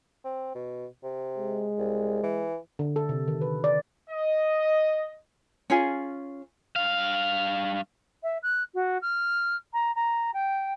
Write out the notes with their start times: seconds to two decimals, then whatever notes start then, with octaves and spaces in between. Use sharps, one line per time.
0.24 C4
0.55 B2
1.03 C3
1.38 G#3
1.78 C2
2.23 E3
2.79 D3
2.96 A4
3.09 C3
3.28 D#3
3.42 B4
3.64 D5
4.09 D#5
5.70 C#4 F4 G#4
6.76 G2 F5
8.23 E5
8.43 F#6
8.74 F#4
9.02 F6
9.73 A#5
9.95 A#5
10.34 G5